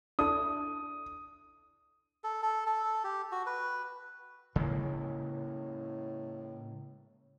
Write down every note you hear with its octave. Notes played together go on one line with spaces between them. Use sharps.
D4 E4 A4 D#6
A4
A4
A4
G4
F#4
B4
A2 C#3 G#3 A#3